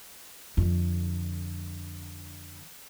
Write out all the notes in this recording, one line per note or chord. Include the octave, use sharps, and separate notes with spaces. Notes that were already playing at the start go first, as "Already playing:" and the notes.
F2 D3